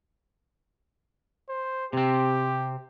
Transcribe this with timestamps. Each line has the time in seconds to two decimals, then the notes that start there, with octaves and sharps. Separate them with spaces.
1.49 C5
1.93 C3 C4 G4